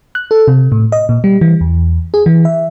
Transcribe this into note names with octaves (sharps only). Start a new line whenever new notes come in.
F#6
A4
C3
A2
D#5
A#2
G3
E3
E2
G#4
E3
E5